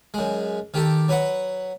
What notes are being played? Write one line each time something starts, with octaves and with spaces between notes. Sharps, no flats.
F#2 G#3
D#3 G4 A4
F#3 B4 F#5